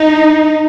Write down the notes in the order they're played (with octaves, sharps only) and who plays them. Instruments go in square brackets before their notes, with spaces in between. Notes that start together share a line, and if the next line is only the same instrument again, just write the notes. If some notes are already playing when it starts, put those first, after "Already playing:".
Already playing: [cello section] D#4